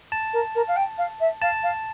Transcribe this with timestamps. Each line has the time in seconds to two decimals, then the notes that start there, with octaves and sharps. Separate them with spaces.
0.12 A5
0.33 A#4
0.55 A#4
0.67 F5
0.76 G5
0.98 F5
1.20 E5
1.41 F5 A5
1.63 F5